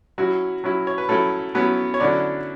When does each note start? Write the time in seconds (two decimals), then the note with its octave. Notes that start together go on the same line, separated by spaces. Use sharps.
0.18 F#3 C#4 E4 F#4
0.64 F#3 C#4 E4
0.87 C#5
0.98 B4
1.09 F#3 A3 C#4 E4 A4
1.55 F#3 B3 C#4 E4 B4
1.94 C#5
2.00 D3 F#3 C#4 D4 E4 D5